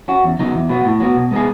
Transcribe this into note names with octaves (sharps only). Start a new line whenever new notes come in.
C#4 F#4
E2
C#3 F#3 B3 D#4
E2
B2 F#3 B3
A2
F#3 B3 F#4
B2
G#3 B3 D#4 G#4